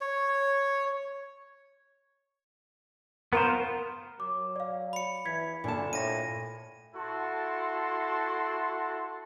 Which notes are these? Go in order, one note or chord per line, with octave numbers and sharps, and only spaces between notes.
C#5
B3 F4 A#4 C5
F#3 D6
D5 F5
B5 C#7
E3 G#6 B6
A#2 D3 A5
A2 A#6 D#7
E4 F#4 A4 A5 C6